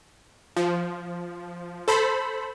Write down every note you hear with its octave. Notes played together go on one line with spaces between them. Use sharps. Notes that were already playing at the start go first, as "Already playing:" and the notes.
F3
A4 C5 B5